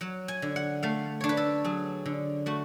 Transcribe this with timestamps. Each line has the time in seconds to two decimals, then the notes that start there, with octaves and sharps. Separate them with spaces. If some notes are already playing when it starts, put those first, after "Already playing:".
0.01 F#3 F#5
0.28 G#5
0.42 D3
0.56 F#5
0.83 A3 F5
1.21 D4 C#5
1.29 B4
1.37 A4
1.65 F#3 G#4
2.06 D3
2.46 A3 F#4